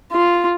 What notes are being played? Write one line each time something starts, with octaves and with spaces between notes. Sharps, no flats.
F4